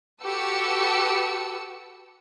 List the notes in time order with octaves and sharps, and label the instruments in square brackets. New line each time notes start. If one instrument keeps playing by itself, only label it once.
[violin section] F#4 G4 A4 B4 E6 C#7